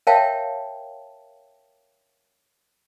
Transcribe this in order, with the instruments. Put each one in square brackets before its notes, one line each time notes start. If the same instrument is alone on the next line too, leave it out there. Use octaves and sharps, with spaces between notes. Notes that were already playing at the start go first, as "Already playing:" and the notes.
[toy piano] A#4 C#5 E5 F5 G5 A5